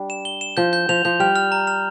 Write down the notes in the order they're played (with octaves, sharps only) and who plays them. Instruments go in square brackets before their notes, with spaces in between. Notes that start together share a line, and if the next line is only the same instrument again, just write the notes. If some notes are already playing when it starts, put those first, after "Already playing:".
Already playing: [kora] G3 D4
[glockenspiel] E7
G7
E7
[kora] F3 [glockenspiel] G6
[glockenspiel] G6
[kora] F3 [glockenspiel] F7
[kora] F3 [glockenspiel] G6
[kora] G3 [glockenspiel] F6
[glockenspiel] F6
A#5
F6